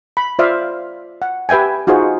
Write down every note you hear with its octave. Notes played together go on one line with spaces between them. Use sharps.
B5
F4 C5 D5 E5 F5
F#5
G4 B4 E5 G5 G#5
D#4 F4 F#4 G#4 C5